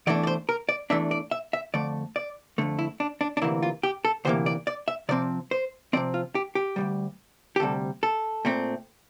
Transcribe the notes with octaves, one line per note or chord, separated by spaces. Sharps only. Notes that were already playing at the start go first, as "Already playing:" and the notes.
E2 E3 A3 D4 D5
D5
C5
A#4
D5
E2 E3 A3 D4 E5
D5
E5
E5
F2 D3 A3 D5
D5
F2 D3 A3
E4
D4
D4
D4
D2 C3 E3 A#3 E4
F4
G4
A4
D2 C3 E3 A#3 C5
D5
D5
E5
C3 F3 C4 D5
C5
C3 F3 C4 D5
F4
G4
G4
D2 C3 G3
G4
D2 C3 G3 A4
A4
A#2 A3 C4